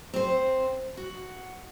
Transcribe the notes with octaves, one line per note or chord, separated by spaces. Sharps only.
C4 C5
F#4